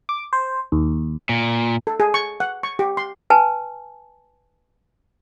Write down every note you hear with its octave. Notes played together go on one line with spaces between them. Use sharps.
D6
C5
D#2
A#2
A4
G#4
C#6
F#5
C#6
G4
C6
B4 G#5 A5